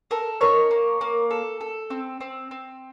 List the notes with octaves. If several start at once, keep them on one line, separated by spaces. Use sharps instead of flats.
A4 A#4
D#4 A#4 C#5
A#3
A#3
A4
A4
C4
C4
C4